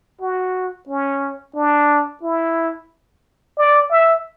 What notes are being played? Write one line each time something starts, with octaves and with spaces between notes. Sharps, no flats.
F#4
C#4
D4
E4
D5
E5